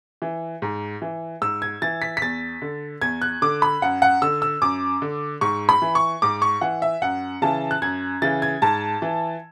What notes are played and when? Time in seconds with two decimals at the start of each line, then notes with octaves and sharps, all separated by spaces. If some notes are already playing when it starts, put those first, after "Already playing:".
0.22 E3
0.62 G#2
1.02 E3
1.42 G#2 E6
1.62 G#6
1.82 E3 A6
2.02 B6
2.17 B6
2.22 E2 A6
2.62 D3
3.01 E2 G#6
3.22 F#6
3.42 D3 D6
3.62 B5
3.82 F#2 F#5
4.02 F#5
4.22 D3 E6
4.42 E6
4.62 F#2 D6
5.02 D3
5.41 G#2 C#6
5.69 B5
5.82 E3
5.95 C#6
6.22 G#2 D6
6.42 C#6
6.61 E3 F#5
6.82 E5
7.02 F#2 F#5
7.42 C#3 E3 A5
7.71 F#6
7.82 F#2 G#6
8.22 C#3 E3 A6
8.42 G#6
8.62 G#2 A5
9.02 E3